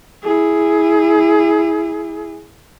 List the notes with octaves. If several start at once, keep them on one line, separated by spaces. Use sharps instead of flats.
E4 G#4